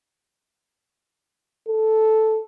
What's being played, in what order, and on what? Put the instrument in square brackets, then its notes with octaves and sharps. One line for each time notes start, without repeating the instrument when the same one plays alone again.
[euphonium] A4